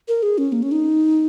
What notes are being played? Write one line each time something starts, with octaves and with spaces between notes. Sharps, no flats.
A#4
G#4
C#4
A#3
C#4
D#4